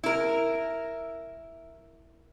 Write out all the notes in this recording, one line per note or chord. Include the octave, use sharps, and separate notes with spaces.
E4 A#4